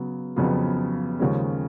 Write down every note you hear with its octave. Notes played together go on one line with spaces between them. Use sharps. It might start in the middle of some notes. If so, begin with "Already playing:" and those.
Already playing: C#3 F#3 B3
F2 C#3 F#3 B3 F4
D#2 C#3 F3 G#3 C#4